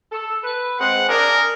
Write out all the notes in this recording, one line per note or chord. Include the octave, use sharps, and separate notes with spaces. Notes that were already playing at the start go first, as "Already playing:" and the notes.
A4
B4
G#3 C4 F#5
D4 G#4 A#4